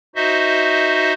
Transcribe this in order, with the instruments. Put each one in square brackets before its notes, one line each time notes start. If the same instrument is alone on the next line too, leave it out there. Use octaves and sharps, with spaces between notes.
[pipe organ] D#4 F#4 C5 D#5 E5